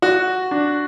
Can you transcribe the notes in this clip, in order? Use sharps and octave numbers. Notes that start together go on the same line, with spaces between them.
F#4
D4